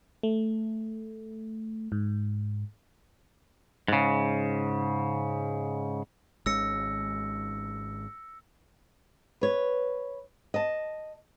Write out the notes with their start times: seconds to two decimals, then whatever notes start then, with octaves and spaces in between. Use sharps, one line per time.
0.23 A3
1.92 G#2
3.88 G#2 C#3
6.46 G#1 G#3 C#4 E6 A#6 C#7
9.41 B4 C#5
10.54 D#5 A5